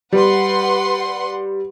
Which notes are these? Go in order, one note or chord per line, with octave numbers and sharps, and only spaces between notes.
G3 B4 F#5 C6